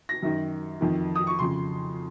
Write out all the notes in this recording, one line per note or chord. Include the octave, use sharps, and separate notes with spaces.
A#6
F#2 D#3
F2 D#3
D#6
C#6
F2 C#3 C6